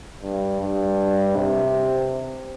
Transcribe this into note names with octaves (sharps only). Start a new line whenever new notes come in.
G2
G2
C3